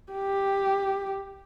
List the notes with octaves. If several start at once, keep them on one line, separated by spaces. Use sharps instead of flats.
G4